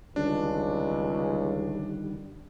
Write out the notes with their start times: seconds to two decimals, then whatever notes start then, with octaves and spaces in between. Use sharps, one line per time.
0.16 C#2 D3 D#3 G3 D4